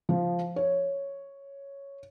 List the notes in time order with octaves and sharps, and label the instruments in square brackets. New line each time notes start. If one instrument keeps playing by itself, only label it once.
[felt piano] F3
C#5